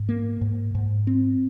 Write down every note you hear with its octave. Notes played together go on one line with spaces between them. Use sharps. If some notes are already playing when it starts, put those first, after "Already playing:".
Already playing: G#2
A#3
G#2
G#2
C4